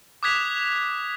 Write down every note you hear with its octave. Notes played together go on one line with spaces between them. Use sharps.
D6 D#6 F#6 G#6 B6 F7